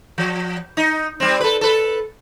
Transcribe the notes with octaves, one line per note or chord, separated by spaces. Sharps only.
F3
D#4
G3 C4
A4 B4
A4 B4